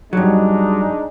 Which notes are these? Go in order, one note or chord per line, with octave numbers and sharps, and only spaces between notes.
G2 F#3 G#3 D4 D#4